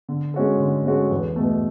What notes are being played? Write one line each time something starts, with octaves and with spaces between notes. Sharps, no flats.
D3
G#3 C#4 F#4 A4
D3
G#3 C#4 F#4 A4
E2
B2 A3